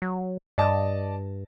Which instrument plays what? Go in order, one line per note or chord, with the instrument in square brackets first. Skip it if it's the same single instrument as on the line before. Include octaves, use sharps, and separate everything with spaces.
[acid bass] F#3
[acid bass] G2 [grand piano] D5 D#5 A5